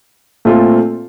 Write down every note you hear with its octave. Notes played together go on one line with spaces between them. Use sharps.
A#2 A3 C4 F4 A4